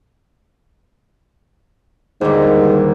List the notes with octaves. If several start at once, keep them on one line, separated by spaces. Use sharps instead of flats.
G1 D#2 G#2